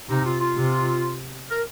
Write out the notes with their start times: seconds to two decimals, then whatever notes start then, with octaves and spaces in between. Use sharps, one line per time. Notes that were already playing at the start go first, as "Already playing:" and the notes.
0.09 C3 D#4
0.25 F4
0.40 F4
0.55 C3
1.50 A#4